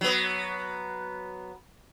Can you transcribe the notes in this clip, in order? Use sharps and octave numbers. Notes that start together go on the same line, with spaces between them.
F#3 B3